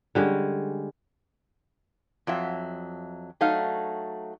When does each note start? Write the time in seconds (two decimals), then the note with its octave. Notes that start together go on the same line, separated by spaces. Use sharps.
0.15 D3 G3 G#3 C#4
2.27 F2 F#3 E5
3.41 F#3 A3 D#4 F5